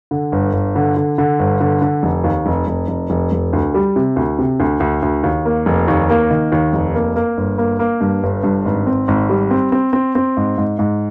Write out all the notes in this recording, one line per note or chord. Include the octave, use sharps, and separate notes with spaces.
D3
G1
G1
D3
D3
D3
G1
D3
D3
F1
D#2
F1
F1
F1
F1
F1
D2
G3
C3
D2
C3
D2
D2
D2
D#2
A#3
F1
D#2
A#3
D#3
D#2
F1
A#3
A#3
G1
A#3
A#3
G2
G1
G2
G#1
C4
G#1
G3
C4
C4
C4
C4
G#2
G#2
G#2